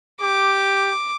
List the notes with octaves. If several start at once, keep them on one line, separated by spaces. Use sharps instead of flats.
G4 D6